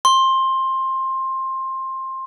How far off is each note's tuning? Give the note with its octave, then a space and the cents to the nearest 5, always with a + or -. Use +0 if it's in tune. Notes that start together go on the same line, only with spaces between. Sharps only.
C6 +15